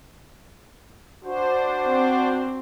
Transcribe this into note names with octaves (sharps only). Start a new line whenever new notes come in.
D4 F#4 C5
C4